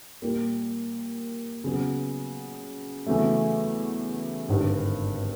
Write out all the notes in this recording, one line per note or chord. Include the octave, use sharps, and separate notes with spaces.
A#2 G3 A#3
C#3 F#3 B3
E2 C#3 F#3 A3
G#1 G2 D3